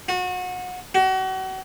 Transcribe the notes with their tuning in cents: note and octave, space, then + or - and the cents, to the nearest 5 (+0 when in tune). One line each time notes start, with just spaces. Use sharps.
F#4 -30
F#4 +35